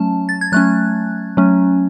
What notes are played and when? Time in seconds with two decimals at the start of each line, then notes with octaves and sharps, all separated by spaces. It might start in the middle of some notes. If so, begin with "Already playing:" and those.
Already playing: F#3 A3 C#4 A5
0.29 A6
0.41 G#6
0.52 F#3 A3 C#4 F#6
1.37 F#3 A3 C#4